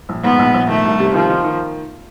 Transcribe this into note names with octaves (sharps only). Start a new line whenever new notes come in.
A#1
G#2 B3
A#1
A#1
D#3 A3
C2
C3
D#3 F3
D#3
D#3